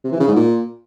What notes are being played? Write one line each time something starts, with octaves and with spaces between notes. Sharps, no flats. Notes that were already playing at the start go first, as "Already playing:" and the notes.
C3
E3
C#3
G#2
A#2